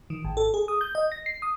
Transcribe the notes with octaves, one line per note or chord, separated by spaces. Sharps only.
D#3
G#1
A4
G#4
D#6
G6
D#5
A#6
C7
D#6